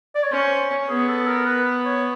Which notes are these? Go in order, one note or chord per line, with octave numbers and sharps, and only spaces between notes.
D5
C#5
C#4 C5
B3 G#4
A4
A#4
B4
C#5